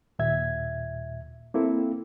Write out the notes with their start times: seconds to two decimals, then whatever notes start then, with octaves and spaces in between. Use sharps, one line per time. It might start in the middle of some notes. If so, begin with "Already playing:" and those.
0.19 D#2 A#2 E5 G#6
1.54 A#3 C4 E4 A4